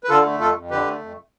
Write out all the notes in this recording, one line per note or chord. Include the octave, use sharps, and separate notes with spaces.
B4
D3 F4 A4
A3
F2 F4 A4
F2
D3 G4 B4
A3
F2